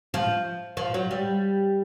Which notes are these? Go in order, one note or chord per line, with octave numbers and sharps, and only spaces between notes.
F3
F3
F#3
G3